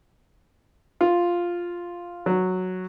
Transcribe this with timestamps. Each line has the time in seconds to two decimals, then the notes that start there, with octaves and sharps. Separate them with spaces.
1.01 F4
2.26 F#3